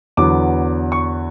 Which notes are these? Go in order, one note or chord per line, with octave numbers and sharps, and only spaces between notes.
E2 D3 F#3 B3 D6
C#6